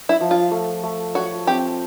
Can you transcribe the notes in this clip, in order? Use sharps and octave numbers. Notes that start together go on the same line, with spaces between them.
E4
F3
F4
A3
A3
F#4 C#5
C4 G4